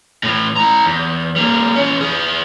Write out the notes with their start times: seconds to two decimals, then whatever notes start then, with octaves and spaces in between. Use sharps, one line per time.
0.23 A2 E3
0.56 E4 A#5
0.85 E2
1.36 G3 A#3
1.75 E3 C#4
2.01 E4 G#4